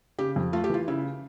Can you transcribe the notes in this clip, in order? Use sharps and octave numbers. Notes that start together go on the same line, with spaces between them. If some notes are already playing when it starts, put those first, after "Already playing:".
C#3 G4
F2
A3 F4
G4
E3 F4
C#3 E4